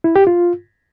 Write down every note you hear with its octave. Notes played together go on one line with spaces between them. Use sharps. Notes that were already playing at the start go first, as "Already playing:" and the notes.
E4
G4
F4